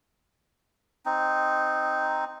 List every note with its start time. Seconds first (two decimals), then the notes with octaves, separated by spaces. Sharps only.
1.05 C4 D#4